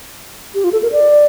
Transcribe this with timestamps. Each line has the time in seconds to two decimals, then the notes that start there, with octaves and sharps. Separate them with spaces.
0.55 G4
0.64 F4
0.73 A4
0.83 A#4
0.92 D5